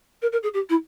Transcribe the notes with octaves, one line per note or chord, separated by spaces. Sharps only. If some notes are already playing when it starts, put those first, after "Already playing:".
A#4
A#4
G#4
G4
E4